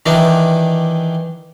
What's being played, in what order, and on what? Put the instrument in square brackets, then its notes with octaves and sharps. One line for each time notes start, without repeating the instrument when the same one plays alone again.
[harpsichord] D#3 E3 G3 D4